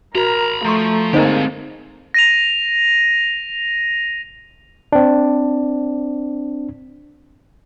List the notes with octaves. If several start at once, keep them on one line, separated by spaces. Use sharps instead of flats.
F#4 A#4 A#5 B5
F3 A3 A#5 C6 C#6
D3 G#3 A#3 C4 D#4 G4 A4 C5
A#6 D#7 F7
C4 D4